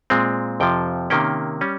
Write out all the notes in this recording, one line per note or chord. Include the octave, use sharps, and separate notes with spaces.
A#2 G#3 C4
F2 C3 F3 G5
C3 D#3 A#3 C#4 G5
G3 C#4